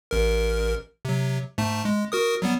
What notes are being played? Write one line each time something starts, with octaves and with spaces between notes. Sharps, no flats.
A1 A#4
C3 F#3
G#2 A3 A5
G#3
F#4 A#4 D#6
F#3 G3 B3